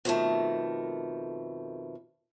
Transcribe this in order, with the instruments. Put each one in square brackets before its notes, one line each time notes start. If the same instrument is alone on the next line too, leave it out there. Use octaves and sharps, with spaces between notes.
[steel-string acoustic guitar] F2 B2 D#3 A3